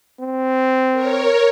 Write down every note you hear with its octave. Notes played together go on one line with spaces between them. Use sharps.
C4
A#4 C#5